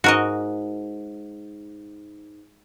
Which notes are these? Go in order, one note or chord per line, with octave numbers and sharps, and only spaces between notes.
G#2 F#4 A#4 D#5